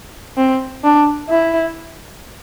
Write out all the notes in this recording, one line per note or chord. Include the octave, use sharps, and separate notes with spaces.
C4
D4
E4